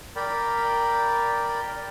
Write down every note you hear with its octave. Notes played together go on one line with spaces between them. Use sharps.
A#4 D5 G5 B5